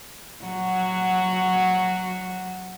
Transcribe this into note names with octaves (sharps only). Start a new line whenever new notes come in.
F#3 F#4